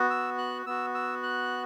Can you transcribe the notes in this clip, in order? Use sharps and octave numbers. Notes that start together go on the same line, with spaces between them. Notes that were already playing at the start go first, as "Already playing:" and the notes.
Already playing: B3 F#4
E6
F#6
B3 F#4 E6
E6
F#6